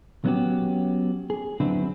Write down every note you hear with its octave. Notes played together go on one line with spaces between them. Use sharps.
F#3 B3 C#4 F#4 G4
G#4
D3 F#3 B3 C4 D4 E4